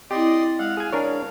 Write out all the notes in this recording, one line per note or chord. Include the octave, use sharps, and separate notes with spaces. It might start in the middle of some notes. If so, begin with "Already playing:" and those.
C4 E4 G4 D5 D#5 C6
G#3 F5 F#5
G#4 F5 G#5
D3 D4 A#4 C#5